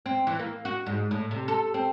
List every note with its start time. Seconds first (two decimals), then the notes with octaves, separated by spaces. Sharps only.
0.06 C4
0.27 E3
0.40 A#3
0.65 F#4
0.86 G#2
1.11 A2
1.31 C3
1.48 A4
1.74 C4